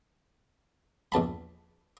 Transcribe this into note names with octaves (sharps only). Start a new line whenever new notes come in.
A#1 E2 A5 B5